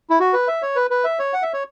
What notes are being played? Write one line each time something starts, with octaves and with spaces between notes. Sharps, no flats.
E4
F#4
B4
E5
C#5
B4
B4
E5
C#5
F#5
E5
C#5